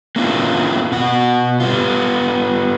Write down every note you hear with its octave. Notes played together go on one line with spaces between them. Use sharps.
A#3 B3 C#4 D4 E4 F4
B2 F#5
G3 B3 F4